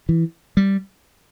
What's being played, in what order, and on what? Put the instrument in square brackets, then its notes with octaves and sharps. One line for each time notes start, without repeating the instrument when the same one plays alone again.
[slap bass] E3
G3